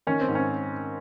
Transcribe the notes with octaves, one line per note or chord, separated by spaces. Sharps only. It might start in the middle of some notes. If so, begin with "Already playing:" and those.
D#3 C#4
C4
G#2
C#4